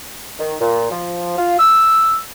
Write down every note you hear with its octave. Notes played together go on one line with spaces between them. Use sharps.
D#3
A#2
F3
F4
E6